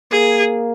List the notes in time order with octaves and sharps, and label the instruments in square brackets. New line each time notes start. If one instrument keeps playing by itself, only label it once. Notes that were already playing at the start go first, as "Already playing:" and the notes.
[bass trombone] A#3 [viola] G#4